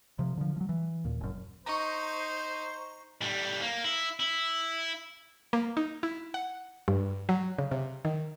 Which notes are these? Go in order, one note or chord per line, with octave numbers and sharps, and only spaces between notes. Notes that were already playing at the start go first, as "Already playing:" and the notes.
C3 F3
D3 F3
F3 F#3
E3
D#2 A#2
F#1 F#2
D#4 C5 A#5 C#6
A2 G3
A#3
E4
E4
A#3
D#4
E4
F#5
G2
F#3
C#3
C3
D#3